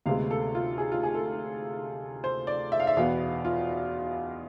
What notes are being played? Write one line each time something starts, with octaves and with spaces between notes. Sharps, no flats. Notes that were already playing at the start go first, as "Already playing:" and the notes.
D2 C3 G#3 B3 F5
A4
F4
G#4
F4
G#4
A4
C5
D5
E5
F5
E5
E2 B2 B3 F5
F4